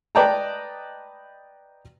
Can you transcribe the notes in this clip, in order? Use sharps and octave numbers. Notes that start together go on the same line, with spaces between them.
B4 D5 D#5 G5 A5 A#5